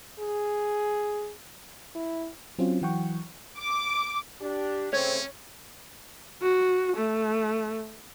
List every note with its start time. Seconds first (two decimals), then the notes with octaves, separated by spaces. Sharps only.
0.20 G#4
1.95 E4
2.59 F#3 C4 C#4 F4
2.82 E3 F#3 F#5 G5 C#6
3.58 D6
4.41 D4 G4
4.93 C#3 A3 C4 C#4 C#5
6.42 F#4
6.97 A3